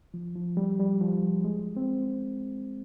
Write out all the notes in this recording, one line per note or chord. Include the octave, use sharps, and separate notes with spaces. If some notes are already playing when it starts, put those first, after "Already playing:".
F3
F3
G3
G3
F3
G#3
C4